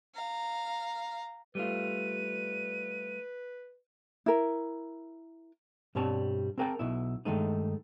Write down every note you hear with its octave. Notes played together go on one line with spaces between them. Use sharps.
F5 A#5
G3 A3 F4 B4 D#7
E4 A#4
G2 B2 G3 C4 C#5 A5
C4 G#4 A#4 F5 G5 A5
B1 B2 E4
G2 D#3 G#3 A3 D#4